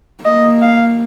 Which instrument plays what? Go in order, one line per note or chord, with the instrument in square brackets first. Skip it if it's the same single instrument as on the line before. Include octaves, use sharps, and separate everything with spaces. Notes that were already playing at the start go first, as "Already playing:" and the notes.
[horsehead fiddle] A#3 [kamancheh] D#5
[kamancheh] F5